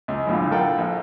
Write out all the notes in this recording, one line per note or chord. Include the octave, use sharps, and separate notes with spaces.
C#2
B1 A2 D3 F4
F4 A4 A#4 F#5 G5
A#1